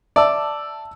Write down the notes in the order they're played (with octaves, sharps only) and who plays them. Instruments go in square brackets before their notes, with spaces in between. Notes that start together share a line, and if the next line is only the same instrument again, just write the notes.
[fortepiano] D5 [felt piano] E5 A5 E6